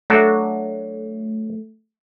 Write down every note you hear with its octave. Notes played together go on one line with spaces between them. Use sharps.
F#3 A3 D4 F#4